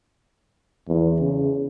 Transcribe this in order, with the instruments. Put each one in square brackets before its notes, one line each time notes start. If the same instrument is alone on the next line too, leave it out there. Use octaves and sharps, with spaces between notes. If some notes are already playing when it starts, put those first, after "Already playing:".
[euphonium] E2
C#3